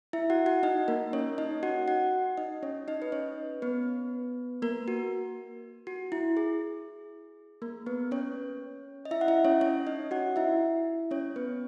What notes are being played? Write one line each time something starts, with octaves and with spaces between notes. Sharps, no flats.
E4 E5
F#4 F#5
F#4 F#5
D#4 D#5
A#3 A#4
C#4 C#5
D#4 D#5
F#4 F#5
F#4 F#5
D#4 D#5
C#4 C#5
D#4 D#5
B4
C#4 C#5
B3 B4
A#3 A#4
F#4
F#4
E4
G#4
A#3 A#4
B3 B4
C#4 C#5
D#5
E4 E5
F#5
E4 E5
C#4 C#5
C#4 C#5
D#4 D#5
F#4 F#5
E4 E5
C#4 C#5
B3 B4